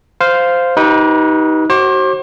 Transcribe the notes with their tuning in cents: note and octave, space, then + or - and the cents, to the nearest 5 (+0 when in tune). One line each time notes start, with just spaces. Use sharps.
C5 -10 F5 +0
D#4 +20 G4 -20 B4 -25
F#4 +30 C5 +40 D6 -10